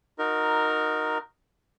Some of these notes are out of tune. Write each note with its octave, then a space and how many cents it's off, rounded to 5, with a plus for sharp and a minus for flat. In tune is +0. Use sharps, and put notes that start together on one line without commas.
D#4 +0 F#4 -25 A#4 +0